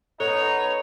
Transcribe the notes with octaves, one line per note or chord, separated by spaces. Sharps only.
B3 D#4 A4 C#5 F7